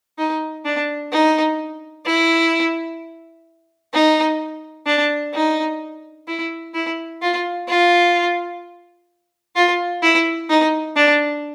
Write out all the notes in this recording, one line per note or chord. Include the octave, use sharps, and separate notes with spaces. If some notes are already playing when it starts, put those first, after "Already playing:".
D#4
D4
D#4
E4
D#4
D4
D#4
E4
E4
F4
F4
F4
E4
D#4
D4